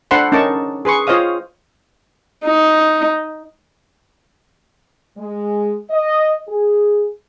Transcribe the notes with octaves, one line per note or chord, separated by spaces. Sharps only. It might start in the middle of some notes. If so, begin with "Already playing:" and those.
D4 A4 C5 F#5 B5 C6
C#4 D#4 A#4 A5 C#6 D6
G#4 B4 C6 C#6
F4 C5 C#5 D#5 F5 D#6
D#4
G#3
D#5
G#4